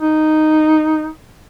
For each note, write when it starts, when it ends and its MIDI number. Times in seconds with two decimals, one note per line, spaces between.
0.01 1.07 63